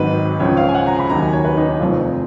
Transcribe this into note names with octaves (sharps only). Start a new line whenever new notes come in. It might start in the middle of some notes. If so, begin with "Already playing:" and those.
Already playing: G#1 G#2 D#3 F#3 B4
C#2 C#3 F3 C#5
F5
G#5
F#5
A#5
B5
D#2 D#3 F#3 A#5
G#5
C#5
B4
D#4
D#4
F1 F2 F3 F4